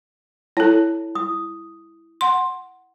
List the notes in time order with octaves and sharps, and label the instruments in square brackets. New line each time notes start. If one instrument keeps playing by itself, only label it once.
[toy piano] E4 A5 [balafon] A4 C#5
[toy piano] D#6
[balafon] F#5 C6